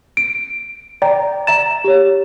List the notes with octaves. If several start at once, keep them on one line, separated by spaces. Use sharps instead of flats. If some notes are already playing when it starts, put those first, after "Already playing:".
D7
D5 G5 A#5
E5 A#5 A6 E7
G4 C#5